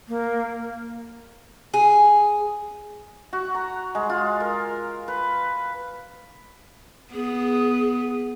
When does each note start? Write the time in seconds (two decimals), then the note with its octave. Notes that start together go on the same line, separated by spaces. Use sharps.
0.08 A#3
1.74 G#4
3.33 F#4
3.54 A#5
3.95 G#3
4.09 F4
4.40 A#4
5.08 B4
7.14 B3 G#4